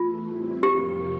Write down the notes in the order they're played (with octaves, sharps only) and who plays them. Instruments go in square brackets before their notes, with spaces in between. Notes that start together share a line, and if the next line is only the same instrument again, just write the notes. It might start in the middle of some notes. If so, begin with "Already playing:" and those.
Already playing: [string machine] E2 E3 A3 [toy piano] F4
[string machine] A2 G3 C4 E4
[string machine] F2 C3 F3 A#3 [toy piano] G4